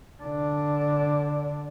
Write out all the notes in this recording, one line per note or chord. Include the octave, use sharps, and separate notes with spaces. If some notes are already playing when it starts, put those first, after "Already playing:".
D3 D4